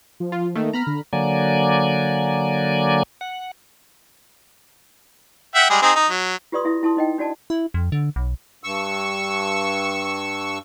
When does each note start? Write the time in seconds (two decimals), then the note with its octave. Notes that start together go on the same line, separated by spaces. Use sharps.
0.20 F3
0.32 F4
0.55 D#3 A3 A#3
0.73 B3 A#5 B5 F6
0.87 D3
1.13 D3 F#3 A#3 D5 G#5
3.21 F#5
5.55 E5 F#5 G5
5.70 G3 G#3 G#4
5.82 C4 D#4 G#4
5.95 D#4
6.10 F#3
6.52 F4 G4 B4 D5 C6 D#6
6.65 E4 E5 D#6
6.83 E4 A5 C6 D#6
6.97 D#4 D#5 G5
7.18 D4 F#4 D5 A5
7.50 E4
7.74 F2
7.92 D3
8.16 B1
8.64 G2 C#6 E6